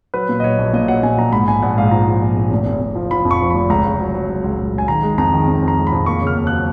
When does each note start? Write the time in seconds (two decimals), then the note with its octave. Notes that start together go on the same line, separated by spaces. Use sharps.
0.14 F#3 B4
0.29 A#2
0.40 D#5
0.44 F#3 C#5
0.58 A#1
0.73 A#2 D#5
0.88 F#3 F#5
1.03 A#2 G#5
1.18 A#1 A#5
1.32 G#2 B5
1.48 A#1 G#5
1.63 A#1 F#5
1.78 G#2 F5
1.91 F3 A#5
2.07 F3
2.22 A#1
2.37 A#1
2.51 F1
2.66 F1
2.81 F1
2.95 F3
3.11 F3 B5
3.25 F2
3.31 C#6
3.41 F3
3.50 F1 B5
3.69 C#2 A#5
3.85 C#2
4.00 F#3
4.15 F#3
4.29 F#3
4.44 C#2
4.58 C#2
4.73 C#2
4.78 G#5
4.88 D#3 A#5
5.03 G#3
5.18 F2 A#5
5.33 D#3
5.47 F2
5.62 F2
5.68 A#5
5.77 G#3
5.87 B5
5.92 F2
6.06 A#3 C#6
6.21 C#3
6.27 F6
6.36 D#2
6.47 F#6
6.52 F#3